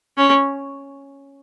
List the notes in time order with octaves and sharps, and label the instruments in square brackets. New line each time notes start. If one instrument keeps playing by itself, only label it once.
[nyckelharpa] C#4